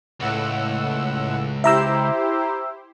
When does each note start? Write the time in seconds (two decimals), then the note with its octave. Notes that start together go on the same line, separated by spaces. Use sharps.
0.20 C#2 A2 F#5 E6
1.64 E4 G4 C5 E5 A#5 E6